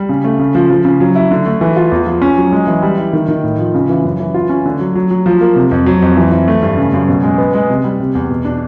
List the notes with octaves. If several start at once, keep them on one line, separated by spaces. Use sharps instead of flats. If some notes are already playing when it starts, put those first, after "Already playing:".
Already playing: G3
C#3
A3
C#3
F3
F3
C#3
F#3
E4
D3
A3
E3
F4
E2
F3
C#4
F#3
G#3
E3
G3
E4
D#3
D#3
A2
F3
C#3
E3
F#2
E3
F4
C#4
D3
F#3
F#3
F#3
F3
A#3
C3
F2
F#3
F2
E3
E3
A3
G2
C#3
F#2
B2
G#3
B3
G#3
C3
G3
C3
E2
B2
D4